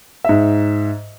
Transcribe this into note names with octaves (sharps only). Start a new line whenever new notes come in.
G#2 E5